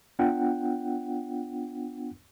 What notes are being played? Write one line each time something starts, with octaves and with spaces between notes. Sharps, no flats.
B3 D4 F4 F#5 G5